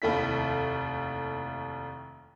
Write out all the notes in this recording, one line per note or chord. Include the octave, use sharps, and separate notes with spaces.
F1 D#2 A3 E4 B6